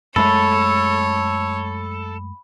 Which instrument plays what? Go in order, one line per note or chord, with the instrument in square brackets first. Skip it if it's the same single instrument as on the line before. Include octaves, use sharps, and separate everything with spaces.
[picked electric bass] F#2 G#3 A3 [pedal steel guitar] A4 [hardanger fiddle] C#5 [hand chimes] B5